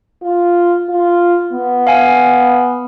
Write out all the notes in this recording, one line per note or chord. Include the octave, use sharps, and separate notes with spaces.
F4
F4
B3
F5 G#5